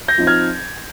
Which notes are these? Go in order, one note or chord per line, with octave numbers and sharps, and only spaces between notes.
G6 A#6
F3 C4 D#4
F6 G#6